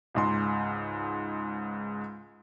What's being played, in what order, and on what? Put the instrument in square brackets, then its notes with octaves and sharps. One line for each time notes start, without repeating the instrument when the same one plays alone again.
[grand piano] C#2 G#2 C6